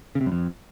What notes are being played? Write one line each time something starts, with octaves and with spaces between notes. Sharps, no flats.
C#3
C3
F#2
F2